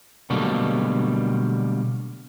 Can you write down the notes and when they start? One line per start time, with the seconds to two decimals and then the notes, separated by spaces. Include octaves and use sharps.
0.30 B2 D3 F#3 G3 A3 A#3